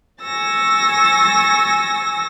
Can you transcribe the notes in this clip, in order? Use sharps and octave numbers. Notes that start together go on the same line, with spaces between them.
G#5 C#6 E6 A6 A#6